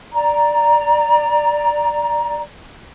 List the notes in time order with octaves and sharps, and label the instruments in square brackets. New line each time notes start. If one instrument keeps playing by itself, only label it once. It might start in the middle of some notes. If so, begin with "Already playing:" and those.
[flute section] D5 A#5